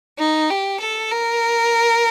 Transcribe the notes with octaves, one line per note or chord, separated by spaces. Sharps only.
D#4
G4
A4
A#4